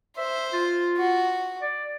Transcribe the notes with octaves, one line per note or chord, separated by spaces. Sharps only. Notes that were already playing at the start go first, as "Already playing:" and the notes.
C5 E5
F4
F#4
D5